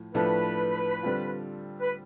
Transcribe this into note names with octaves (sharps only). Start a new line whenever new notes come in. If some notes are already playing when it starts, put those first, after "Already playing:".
Already playing: A2 F3
A2 F3 A3 D4 B4
D3 G3 C4 F4
B4